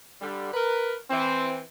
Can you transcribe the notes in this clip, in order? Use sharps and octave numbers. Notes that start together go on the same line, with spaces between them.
D3 G3
A#4 B4
E3 C4